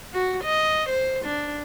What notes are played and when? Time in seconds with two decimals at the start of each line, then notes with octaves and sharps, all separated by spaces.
0.14 F#4
0.44 D#5
0.90 C5
1.25 D4